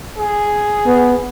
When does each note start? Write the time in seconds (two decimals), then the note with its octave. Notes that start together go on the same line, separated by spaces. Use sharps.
0.18 G#4
0.86 B3